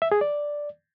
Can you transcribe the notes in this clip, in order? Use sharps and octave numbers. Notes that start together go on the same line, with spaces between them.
E5
G#4
D5